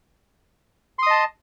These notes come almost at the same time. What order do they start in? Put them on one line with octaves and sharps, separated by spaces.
C6 D#6 D#5 A5